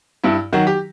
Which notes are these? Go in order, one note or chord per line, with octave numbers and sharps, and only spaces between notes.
G2 E4
D#3 F#3 F#4
G4